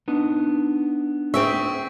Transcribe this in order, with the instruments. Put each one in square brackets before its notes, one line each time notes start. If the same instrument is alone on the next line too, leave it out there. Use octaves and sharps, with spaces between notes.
[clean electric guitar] B3 D4 D#4
[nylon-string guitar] C4 G#4 E5 [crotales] C#6 D7